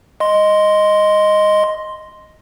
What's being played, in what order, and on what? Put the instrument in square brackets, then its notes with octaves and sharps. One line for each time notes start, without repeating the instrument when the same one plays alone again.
[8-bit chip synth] D#5 C6